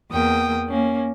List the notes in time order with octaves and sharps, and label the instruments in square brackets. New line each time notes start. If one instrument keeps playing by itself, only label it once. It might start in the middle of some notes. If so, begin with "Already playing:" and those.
[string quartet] E2 A#3 G5 D#6
A#3 C#4